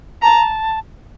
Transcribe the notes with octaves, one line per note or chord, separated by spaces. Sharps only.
A5 A#5